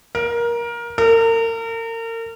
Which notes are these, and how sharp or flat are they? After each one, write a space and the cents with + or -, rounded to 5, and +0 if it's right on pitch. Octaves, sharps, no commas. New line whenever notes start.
A#4 +20
A#4 -35